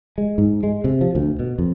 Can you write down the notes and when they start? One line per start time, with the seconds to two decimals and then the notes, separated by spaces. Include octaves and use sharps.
0.18 G#3
0.38 G#2
0.63 G#3
0.84 C3
1.01 F3
1.15 D2
1.39 B2
1.58 F2